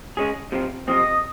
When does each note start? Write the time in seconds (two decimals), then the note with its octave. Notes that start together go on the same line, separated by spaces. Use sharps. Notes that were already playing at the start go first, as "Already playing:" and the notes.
0.17 G#3 C#4 G#4
0.52 C3 F3 C4
0.87 C3 F3 C4 D#5